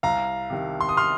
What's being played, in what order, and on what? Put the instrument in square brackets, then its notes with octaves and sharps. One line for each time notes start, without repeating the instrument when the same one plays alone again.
[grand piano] C2 F5 A#5
C3 D#3
C6
D#6
C6 F6